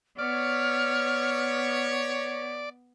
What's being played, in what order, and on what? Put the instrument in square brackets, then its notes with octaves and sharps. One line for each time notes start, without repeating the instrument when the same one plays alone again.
[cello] B3 [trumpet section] C#5 [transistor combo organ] D5 [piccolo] F6